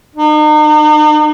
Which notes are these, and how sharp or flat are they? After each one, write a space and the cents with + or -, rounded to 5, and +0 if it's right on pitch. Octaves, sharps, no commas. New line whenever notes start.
D#4 -40